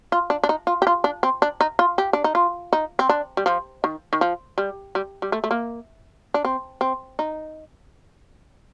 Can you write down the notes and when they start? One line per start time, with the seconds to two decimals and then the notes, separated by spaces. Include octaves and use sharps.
0.12 F4
0.30 D4
0.44 D4
0.49 D#4
0.67 F4
0.82 G4
0.87 F4
1.04 D4
1.23 C4
1.42 D4
1.61 D#4
1.79 F4
1.98 G4
2.13 D4
2.24 D#4
2.35 F4
2.73 D#4
2.99 C4
3.09 D4
3.37 G3
3.46 F3
3.84 D#3
4.13 D#3
4.21 F3
4.58 G3
4.95 G3
5.22 G3
5.32 A3
5.44 A3
5.51 A#3
6.34 D4
6.45 C4
6.81 C4
7.19 D#4